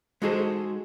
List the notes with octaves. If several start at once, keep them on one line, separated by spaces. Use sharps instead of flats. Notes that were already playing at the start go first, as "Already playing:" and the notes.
G#3 D#4 F#4 G#4 A4 C5